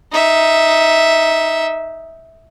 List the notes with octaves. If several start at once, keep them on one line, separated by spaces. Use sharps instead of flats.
D#4 E5